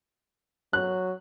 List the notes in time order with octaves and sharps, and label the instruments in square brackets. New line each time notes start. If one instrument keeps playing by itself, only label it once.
[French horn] F#3 [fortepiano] F#6